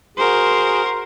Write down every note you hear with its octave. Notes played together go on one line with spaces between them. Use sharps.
F#4 G#4 A#4 C5